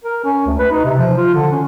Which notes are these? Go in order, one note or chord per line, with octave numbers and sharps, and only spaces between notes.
A#4
C#4
D2
B4
D#4
C3
F3
F4
D3
C#4